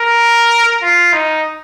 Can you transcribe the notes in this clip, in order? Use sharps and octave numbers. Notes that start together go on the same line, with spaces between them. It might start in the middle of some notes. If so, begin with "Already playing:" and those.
Already playing: A#4
F4
D#4